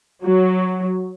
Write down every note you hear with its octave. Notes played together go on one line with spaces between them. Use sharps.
F#3